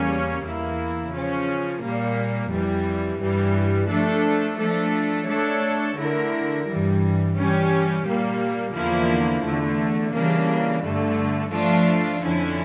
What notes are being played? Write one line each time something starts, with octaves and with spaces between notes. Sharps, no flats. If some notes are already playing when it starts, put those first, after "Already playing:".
Already playing: E2 C#3 G3 A#3 C#4
E2 E3 A#3 E4
C#3 F3 C#4
A#2 G3 A#3
F2 E3 G3
G2 E3 G3
F3 A3 D4 A4
F3 A3 D4 A4
A3 D4 A4 C#5
D3 A3 E4 A#4
G2 E3 G3
E3 G3 C#4 G4
A#2 G3 A#3
E2 D3 F3 A#3 E4
E2 D3 A3
C#3 E3 G3 A#3 D4
G2 D3 A3
F3 A3 D4 F4
F2 D3 F3 C#4 E4